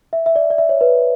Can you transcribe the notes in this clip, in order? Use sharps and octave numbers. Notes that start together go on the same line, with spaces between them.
E5
E5
D5
D5
E5
C#5
B4